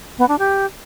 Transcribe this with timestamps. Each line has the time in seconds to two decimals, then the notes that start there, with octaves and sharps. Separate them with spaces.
0.18 B3
0.29 D4
0.39 G4